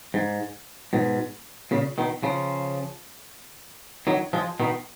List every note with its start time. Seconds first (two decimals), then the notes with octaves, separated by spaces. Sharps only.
0.14 G#2
0.93 G#2 B2
1.71 A#2 C#3
1.98 B2 D#3
2.23 C#3 F3
4.07 D#3 F#3
4.33 F3 G#3
4.60 B2 D#3